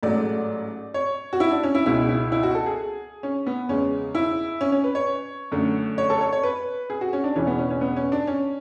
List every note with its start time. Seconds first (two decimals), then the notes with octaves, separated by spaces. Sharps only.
0.03 A1 G#2 F#3 A3 D5
0.94 C#5
1.33 F#4
1.40 E4
1.51 D4
1.63 C#4
1.75 E4
1.86 C#2 B2 G#3 E4
2.09 E4
2.32 E4
2.43 F#4
2.55 A4
2.66 G#4
3.23 C#4
3.46 B3
3.69 E2 C#3 G#3 C#4
4.15 E4
4.61 C#4
4.72 C#4
4.84 B4
4.95 C#5
5.52 F#2 D3 A3
5.98 C#5
6.10 A4
6.21 C#5
6.33 C#5
6.43 B4
6.90 G#4
7.01 F#4
7.13 C#4
7.24 D4
7.36 E1 E2 C#3 E3 C#4
7.47 B3
7.58 C#4
7.70 C#4
7.81 B3
7.96 C#4
8.12 D4
8.27 C#4